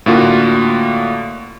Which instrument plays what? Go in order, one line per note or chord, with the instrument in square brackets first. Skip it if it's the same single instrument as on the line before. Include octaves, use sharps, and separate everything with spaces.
[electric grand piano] A2 D3 A#3 F4 F#4